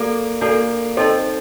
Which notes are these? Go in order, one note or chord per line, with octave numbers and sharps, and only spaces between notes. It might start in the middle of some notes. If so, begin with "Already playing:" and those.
Already playing: A#3 F#4 A4 D5
A#3 D4 F#4 A4 D5
C4 D#4 A4 D#5 A5 C6